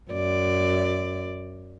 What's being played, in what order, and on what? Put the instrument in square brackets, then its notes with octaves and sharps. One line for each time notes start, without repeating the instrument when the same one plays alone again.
[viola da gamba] F#2 D5